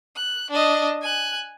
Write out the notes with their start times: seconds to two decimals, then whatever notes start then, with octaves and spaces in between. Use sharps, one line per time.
0.16 F#6
0.50 D4 D#5
1.02 G#5 F#6